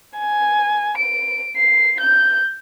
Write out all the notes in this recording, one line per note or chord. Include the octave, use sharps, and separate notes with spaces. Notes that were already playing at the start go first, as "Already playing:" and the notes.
G#5
D7
C7
G6